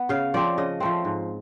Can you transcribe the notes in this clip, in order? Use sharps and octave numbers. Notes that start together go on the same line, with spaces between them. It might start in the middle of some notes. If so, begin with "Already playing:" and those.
Already playing: B3
C#3 F5
F3 A3 C4 D5
C#3 D#5
F3 A3 C4
G#2